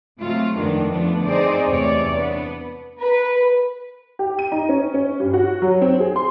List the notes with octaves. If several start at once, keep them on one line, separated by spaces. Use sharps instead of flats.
C3 F#3 G#3 A3 F4
F2 A2 D#3 G#3 B3 D4
D3 F3 A3 B3 D4
C4 D#4 G#4 C5 D5
E2 C3 A3 C#5 D5
B3 D4
B4
G4
D#7
D#4
C#4
C#4
G2
F#4
F#3
C4
G#4
C6